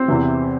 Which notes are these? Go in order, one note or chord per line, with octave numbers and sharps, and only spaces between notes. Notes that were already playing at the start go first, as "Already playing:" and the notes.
Already playing: C4 C5
E2 C3 E3